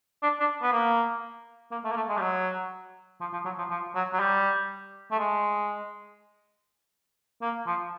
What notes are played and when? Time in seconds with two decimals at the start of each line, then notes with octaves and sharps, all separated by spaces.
0.23 D4
0.40 D4
0.62 B3
0.72 A#3
1.72 A#3
1.84 A3
1.91 A#3
1.96 A3
2.09 G#3
2.17 G3
2.21 F#3
3.21 F3
3.33 F3
3.45 F#3
3.58 F3
3.70 F3
3.95 F#3
4.13 F#3
4.20 G3
5.11 A3
5.19 G#3
7.42 A#3
7.67 F3